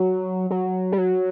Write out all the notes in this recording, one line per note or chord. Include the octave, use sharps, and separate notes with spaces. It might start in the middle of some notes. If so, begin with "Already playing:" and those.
Already playing: F#3
F#3
G3
F#3